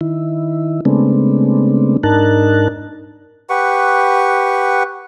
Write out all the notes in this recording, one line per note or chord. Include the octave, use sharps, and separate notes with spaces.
D#3 E4
C#3 G#3 A3 B3 C4 D4
G#2 D4 D#4 A#4 A5 F#6
G4 B4 F#5 C#6